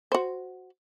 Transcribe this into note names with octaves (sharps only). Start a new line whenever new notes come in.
F#4 C5